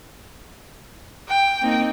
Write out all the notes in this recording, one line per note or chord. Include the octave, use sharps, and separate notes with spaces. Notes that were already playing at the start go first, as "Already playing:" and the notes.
G5
A#3 C4 D#4